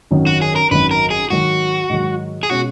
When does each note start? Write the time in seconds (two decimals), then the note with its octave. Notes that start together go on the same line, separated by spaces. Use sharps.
0.11 G#1 F#2 D#3 F#3
0.27 F#4
0.41 G#4
0.56 A#4
0.71 G#1 F#2 D#3 F#3 B4
0.91 A#4
1.11 G#4
1.30 G#2 D#3 F#3 F#4
1.90 G#2 D#3 F#3
2.43 G#4
2.50 B2 G#3 C#4 F#4